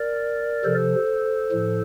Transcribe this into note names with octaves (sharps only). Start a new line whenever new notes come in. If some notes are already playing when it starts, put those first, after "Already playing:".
Already playing: A#4 D5
C3 F3 A4 C5
A2 F3